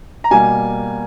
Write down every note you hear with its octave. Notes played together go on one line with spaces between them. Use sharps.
A#5
B2 G3 A#3 G#5